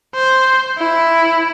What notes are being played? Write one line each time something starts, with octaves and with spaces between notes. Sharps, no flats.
C5
E4